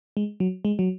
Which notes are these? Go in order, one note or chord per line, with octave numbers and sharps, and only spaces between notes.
G#3
F#3
G#3
F#3